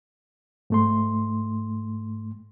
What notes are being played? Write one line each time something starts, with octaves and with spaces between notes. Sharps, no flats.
G#2 A3 C6